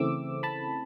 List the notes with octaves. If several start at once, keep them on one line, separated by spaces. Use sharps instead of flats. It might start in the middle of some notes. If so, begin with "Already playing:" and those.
Already playing: C#3 E3 A3 C4 D6 E6
A5 B5